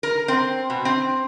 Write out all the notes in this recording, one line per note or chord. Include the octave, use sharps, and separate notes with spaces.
A#4
C4
B2
C4